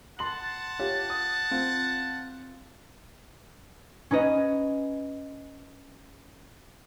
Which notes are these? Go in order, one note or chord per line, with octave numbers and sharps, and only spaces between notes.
F#5 A5 C6 F#7
F4 G4 C#5
D#6
C4 F4
C#4 D#4 B4 D#5